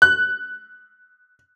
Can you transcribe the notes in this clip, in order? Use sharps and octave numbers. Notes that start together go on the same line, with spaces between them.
F#6